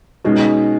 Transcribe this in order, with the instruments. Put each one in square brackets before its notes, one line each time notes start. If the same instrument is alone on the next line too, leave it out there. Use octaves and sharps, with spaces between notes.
[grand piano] B2 G#3 C#4 [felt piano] D#4